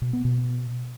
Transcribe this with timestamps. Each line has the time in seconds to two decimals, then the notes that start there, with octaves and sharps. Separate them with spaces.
0.02 B2
0.13 B3
0.25 B2